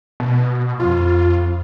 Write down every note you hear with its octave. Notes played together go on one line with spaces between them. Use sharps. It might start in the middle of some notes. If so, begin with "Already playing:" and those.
B2
F2 F4